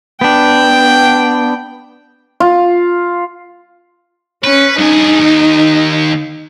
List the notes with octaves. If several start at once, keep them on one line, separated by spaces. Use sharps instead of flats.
B3 D4 G5
F4
C#4 B4
G2 D#4 G#4
D#2